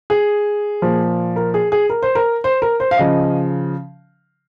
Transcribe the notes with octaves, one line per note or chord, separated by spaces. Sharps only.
G#4
A#2 F3
A#4
G#4
G#4
A#4
C5
A#4
C5
A#4
C5
F5
C#3 F3 D#5